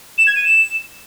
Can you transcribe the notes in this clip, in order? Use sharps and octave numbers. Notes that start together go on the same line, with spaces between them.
E7
G#6
D#7
E7